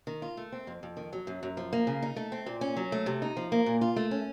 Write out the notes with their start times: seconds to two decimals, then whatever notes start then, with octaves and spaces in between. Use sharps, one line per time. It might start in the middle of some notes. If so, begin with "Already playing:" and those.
0.07 D#3
0.22 F4
0.37 A3
0.52 C4
0.67 F2
0.83 F2
0.97 D#3
1.13 F#3
1.27 F#2
1.43 F#2
1.57 F3
1.73 A#3
1.87 C#3
2.03 D#4
2.16 A3
2.32 C4
2.46 A#2
2.61 C#4
2.77 F#3
2.92 A3
3.06 C3
3.22 D#4
3.37 F3
3.52 A#3
3.66 A#2
3.81 F4
3.96 A3
4.11 C#4